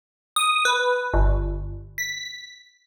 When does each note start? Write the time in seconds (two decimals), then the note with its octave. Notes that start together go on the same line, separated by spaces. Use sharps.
0.36 D#6
0.65 B4
1.14 G1
1.98 B6